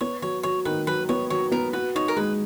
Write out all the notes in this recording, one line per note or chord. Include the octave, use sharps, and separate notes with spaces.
B3 C#5
F#3 C#5
F#3 C#5
D#3 B4
F#3 B4
B3 C#5
F#3 C#5
B3 A#4
F#4 B4
D#4 C#5
A#4
G#3 B4